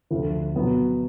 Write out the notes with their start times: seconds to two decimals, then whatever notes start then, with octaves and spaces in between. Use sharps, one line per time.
0.11 D2 D3 F3
0.54 B2 F#3 B3